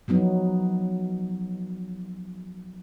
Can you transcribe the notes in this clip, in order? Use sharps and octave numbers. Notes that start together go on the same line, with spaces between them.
F3 F#3 B3 D#4